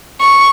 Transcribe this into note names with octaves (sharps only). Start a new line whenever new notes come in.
C#6